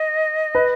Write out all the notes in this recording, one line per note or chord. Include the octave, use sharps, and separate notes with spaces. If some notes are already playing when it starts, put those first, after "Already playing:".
Already playing: D#5
B4